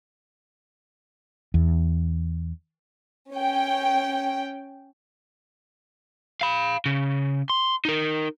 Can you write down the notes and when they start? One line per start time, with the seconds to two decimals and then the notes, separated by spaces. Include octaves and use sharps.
1.54 E2
3.32 C#4 G5
6.41 F5 B5
6.86 C#3
7.50 C6
7.85 D#4 A#4